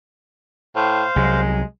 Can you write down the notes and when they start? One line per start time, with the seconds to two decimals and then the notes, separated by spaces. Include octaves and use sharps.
0.76 A2 C5 F5
1.16 C2 F#3 G#3